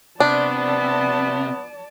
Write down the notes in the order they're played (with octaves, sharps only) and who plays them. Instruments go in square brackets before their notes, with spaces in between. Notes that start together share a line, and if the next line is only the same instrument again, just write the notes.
[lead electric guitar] C3 [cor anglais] B3 [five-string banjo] D4 [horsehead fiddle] D5 A5